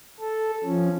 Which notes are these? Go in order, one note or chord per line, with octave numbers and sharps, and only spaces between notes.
A4
F3 C#4